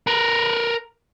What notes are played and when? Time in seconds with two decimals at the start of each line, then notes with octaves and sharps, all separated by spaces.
0.07 A#4 B4